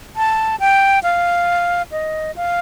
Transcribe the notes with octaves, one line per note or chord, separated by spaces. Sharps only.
A5
G5
F5
D#5
F5